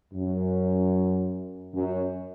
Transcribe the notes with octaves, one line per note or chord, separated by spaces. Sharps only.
F#2
F#2